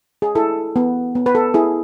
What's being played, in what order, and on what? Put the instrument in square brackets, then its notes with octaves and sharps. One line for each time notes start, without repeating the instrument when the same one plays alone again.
[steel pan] G#4
E4 A4
B3
B3
B4
A4
E4 G#4